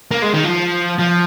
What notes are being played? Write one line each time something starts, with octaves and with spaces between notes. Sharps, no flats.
A#3
G#3
D#3
F3
F3